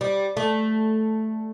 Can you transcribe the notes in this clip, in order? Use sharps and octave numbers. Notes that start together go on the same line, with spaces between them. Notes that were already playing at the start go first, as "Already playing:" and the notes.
G3
A3